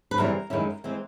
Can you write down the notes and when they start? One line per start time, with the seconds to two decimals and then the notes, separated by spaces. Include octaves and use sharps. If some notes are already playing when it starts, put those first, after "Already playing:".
0.11 B4
0.17 F#2 C#3 E3 G3 C4 A#4
0.50 F#2 D#3 G#3 C#4 E4
0.84 E3 G#3 C4